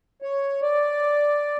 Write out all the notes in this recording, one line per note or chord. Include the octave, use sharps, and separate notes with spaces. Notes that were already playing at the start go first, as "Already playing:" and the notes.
C#5
D5